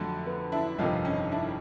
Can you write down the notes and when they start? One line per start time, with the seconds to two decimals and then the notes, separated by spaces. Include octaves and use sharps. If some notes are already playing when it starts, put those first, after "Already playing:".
Already playing: F2 D3 F#3 A3
0.26 B3
0.52 D4 E4
0.78 G1 F2 C3 D#3 D#4 F4
1.05 C#4 D#4
1.32 D4 E4